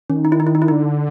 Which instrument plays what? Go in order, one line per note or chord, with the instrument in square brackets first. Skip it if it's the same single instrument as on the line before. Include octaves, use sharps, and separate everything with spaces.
[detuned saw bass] D#3 [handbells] C#4
[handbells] D#4
E4
D#4
E4
D#4
E4
[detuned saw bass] D3 [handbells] D#4